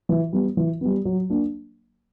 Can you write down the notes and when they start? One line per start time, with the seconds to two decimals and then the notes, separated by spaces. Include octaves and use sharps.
0.09 E3
0.33 G3 B3
0.57 E3
0.81 G3 B3
1.05 F#3
1.30 A#3 D4